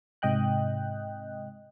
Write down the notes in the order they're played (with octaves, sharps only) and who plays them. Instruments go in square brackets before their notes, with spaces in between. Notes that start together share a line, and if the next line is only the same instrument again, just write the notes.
[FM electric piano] G#2 C3 D#5 G5 F#6